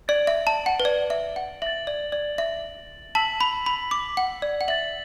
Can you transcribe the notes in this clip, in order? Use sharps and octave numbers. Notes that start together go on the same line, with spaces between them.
D5 A6 D7 F#7
E5
A5
F#5
B4
D5
E5
F#5
E5 A6 F#7
D5
D5
E5
A5 E6 B6 F#7
B5
B5
D6
F#5
D5
F#5
E5 A6 F#7